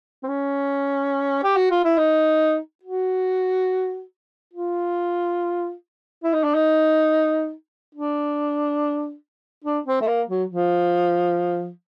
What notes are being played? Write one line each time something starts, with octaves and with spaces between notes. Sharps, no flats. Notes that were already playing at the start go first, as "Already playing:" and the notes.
C4
C#4
G4
F#4
F4
E4
D#4
F#4
F4
E4
D#4
D4
D#4
D4
D4
C4
A3
A#3
F#3
F3